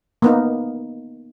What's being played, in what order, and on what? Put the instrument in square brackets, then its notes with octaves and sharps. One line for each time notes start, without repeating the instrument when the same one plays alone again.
[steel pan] A#3 B3 D#4